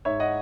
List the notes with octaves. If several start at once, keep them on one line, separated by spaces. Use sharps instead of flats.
G#2 C#5 E5
D#5 F#5